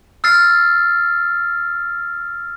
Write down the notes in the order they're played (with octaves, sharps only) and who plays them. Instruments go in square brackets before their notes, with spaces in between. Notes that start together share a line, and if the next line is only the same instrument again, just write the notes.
[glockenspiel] E6 F6 A6 C7